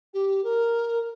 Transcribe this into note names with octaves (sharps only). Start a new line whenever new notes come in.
G4
A#4